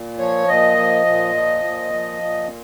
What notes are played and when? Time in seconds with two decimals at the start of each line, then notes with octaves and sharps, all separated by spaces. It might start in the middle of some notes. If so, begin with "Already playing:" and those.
Already playing: A#2
0.19 F3 C#5
0.48 A#2 D#5
0.77 F3
1.06 A#2
1.35 F3
1.65 A#2
1.94 F3
2.22 A#2